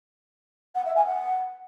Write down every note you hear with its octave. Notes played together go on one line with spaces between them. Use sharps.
F#5
E5
G#5
F#5